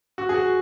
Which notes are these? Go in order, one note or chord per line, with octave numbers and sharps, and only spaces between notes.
F#4
G#4
F#4